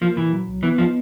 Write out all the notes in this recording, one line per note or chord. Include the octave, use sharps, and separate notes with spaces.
F3 A#3
A#2 E3
F#3
C2
E3 B3
F3 D#4